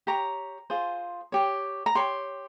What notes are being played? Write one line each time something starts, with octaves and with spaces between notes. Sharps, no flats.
G4 C#5 A#5
F4 G#4 C5
G4 C#5
A#5
G4 C#5 C6